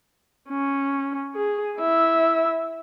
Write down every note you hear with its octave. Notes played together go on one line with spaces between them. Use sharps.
C#4
G#4
E4 E5